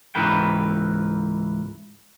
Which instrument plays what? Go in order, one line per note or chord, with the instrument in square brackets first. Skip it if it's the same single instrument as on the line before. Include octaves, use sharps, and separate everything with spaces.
[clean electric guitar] C#2 G#2 E3 A#4 B4 G5